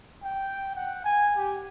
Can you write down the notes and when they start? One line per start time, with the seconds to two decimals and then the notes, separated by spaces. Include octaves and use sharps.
0.23 G5
0.75 F#5
1.05 G#5
1.37 G4